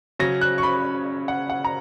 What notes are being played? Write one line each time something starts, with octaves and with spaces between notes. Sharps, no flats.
C#3 F#3 C#4 A#6
F#6
C#6
B5
F#5
F#5
A#5